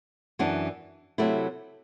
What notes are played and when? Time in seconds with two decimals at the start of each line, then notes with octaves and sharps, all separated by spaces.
0.39 F#2 E3 B3 D4
1.18 C3 F#3 A3 E4